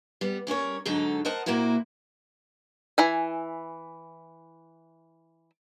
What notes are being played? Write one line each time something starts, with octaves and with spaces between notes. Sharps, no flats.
G3 B3
G3 C#4 A#4 C#5
G#2 D3 F#3 D#4 A4
A#4 C5 D#5 F#5 A5
A#2 A#3 C4 E4 F#4
E3 E4 G#5